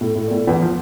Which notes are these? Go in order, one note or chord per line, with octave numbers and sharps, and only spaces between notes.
A2
A2
A#2
A2
E2 E3
F3